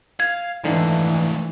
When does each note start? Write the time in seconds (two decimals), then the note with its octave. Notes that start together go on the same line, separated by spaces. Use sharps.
0.20 F5 G#6
0.64 G#1 D3 E3 F3 A3 D#4